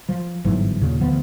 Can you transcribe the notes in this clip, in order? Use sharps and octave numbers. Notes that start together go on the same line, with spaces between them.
F3
G1 G#2 E3 F#3
D#2 A#2 C#3
D2 E3 F3 B3